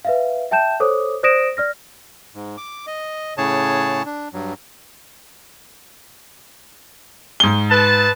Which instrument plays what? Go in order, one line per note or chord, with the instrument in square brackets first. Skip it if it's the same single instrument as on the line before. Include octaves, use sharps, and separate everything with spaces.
[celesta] B4 E5 F5
E5 G5 A5 G6 E7
A4 C5 C#5 D6 D#6
C5 D5 D#6 A#6 D7 E7
D5 F6 A#6
[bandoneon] G#2
D6
D#5
A2 C#3 G#4 C#5 A5
D4
G2 F#3
[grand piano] G#2 G7
[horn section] B4 A5